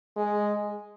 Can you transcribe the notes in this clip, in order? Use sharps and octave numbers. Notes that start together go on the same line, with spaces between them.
G#3